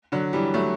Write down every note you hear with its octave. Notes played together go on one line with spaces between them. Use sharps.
D3 F#3
E3 G3
F#3 A3